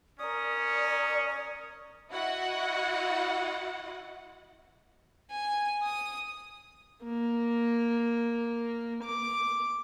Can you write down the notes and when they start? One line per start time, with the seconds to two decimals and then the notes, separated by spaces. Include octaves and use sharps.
0.19 C#4 A#4 D5 D#6
2.11 E4 F#4 D#5 F#5
5.31 G#5
5.83 D#6
7.04 A#3
9.04 D6